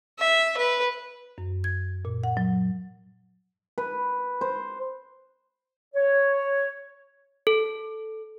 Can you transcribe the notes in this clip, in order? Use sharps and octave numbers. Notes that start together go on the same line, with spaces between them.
E5
B4
F#2
G#6
A#2
F#5
F#3
B4
C5
C#5
A4